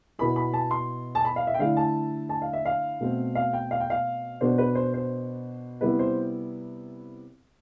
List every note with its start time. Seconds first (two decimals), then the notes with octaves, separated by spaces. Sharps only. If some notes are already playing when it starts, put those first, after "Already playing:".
0.19 B2 B3 E4 B5
0.36 B5
0.53 A5
0.71 C6
1.15 A5
1.25 B5
1.36 F5
1.47 E5
1.54 G5
1.59 D3 A3 E4 F5
1.77 A5
2.29 A5
2.42 F5
2.53 E5
2.65 F5
3.00 B2 A3 C4
3.35 F5
3.53 G5
3.71 F5
3.80 G5
3.90 F5
4.41 B2 B3 D4 C5
4.58 B4
4.75 C5
4.94 C5
5.81 C3 G3 B3 E4 B4
5.99 C5